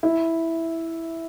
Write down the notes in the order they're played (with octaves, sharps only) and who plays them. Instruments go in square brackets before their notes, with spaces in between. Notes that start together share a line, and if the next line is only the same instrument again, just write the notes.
[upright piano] E4